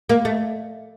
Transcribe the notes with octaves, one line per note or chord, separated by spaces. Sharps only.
A#3
A3